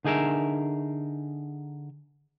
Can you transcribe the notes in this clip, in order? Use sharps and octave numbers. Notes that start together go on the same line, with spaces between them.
D3 D#4 G#4 A#4 E5